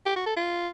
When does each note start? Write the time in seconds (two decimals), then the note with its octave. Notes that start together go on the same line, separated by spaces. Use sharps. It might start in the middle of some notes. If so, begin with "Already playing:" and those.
0.06 G4
0.16 F#4
0.26 A4
0.36 F4